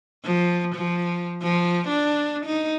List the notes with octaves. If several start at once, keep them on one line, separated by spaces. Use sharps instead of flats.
F3
F3
F3
D4
D#4